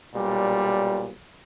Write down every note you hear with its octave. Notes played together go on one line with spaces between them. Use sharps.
B1 A#2 G3